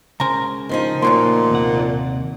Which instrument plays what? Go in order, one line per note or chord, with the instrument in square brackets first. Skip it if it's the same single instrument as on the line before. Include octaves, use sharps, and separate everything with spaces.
[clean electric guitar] C#2 C#3 G#5 [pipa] A#4 C5 A#5
[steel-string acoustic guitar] D#3 F3 D#4
[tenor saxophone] A#2 [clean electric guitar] A3 A#3 [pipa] C#4 F#4 C6
[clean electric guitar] D#2 C3 F#5